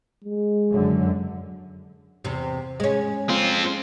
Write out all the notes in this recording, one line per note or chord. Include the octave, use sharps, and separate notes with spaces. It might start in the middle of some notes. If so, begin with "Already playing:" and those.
G#3
F#2 D3
E2 C3
G#3 C#4
C4 F4